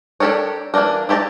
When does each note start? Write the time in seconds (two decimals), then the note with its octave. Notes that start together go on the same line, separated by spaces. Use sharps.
0.20 D4 G4 A4 A#4 C#5
0.74 E3 A#3 D4 D#4 A#4
1.09 E4 G4 C5 A5 A#5